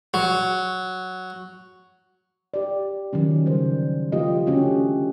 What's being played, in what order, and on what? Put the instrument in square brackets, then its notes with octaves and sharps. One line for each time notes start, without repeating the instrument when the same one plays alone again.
[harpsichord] F#3
[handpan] G4 D5
D#3 F3 F#3 C#4
C#3 G3 C5
F3 A3 F4 G4 D#5
D3 A3 C#4 F#4 G4